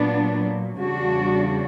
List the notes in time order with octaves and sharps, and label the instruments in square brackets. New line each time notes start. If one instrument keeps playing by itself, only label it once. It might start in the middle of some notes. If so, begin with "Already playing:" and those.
Already playing: [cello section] A#2 F#3 B3 D4
E2 C#3 G3 D4 F#4